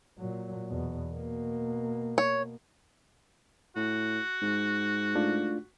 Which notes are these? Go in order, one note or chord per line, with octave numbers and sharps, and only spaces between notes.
A#2 F#3
E2 B2
B2 A#3
C#5
A2 F#4
G#2
A3 D4 F4